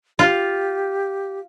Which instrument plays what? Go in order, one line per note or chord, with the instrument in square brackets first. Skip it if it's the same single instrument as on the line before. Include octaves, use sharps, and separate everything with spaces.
[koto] F4 [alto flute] G4